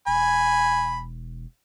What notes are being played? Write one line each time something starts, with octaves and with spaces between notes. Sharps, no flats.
E1 G#5 B5